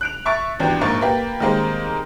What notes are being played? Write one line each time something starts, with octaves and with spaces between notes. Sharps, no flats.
F#6 D7 F7
E5 C#6 A6 D7
G#1 E2 D4 G4
A#1 G#2 A#3 C#6 A6
A#3 G4 B4
D#3 G3 G#3 A#3 C4